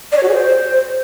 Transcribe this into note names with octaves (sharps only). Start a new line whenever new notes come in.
D5
C#5
F#4
G#4
C5